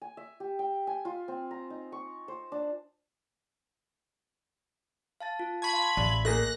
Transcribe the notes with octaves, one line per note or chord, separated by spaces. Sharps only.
G#5
E5
G4
G5
G#5
F4
C4
A#5
D#4
C#6
C5
D4
F5 A5 A6
F4
A5 B5 C#6 G#6
F5 C6
A1 D5 E5
A3 A#3 G#4 F#6 A#6